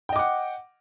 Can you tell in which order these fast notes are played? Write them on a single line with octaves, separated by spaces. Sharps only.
G5 D#5 D6 F#5